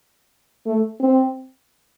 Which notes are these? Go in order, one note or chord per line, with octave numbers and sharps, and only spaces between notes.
A3
C4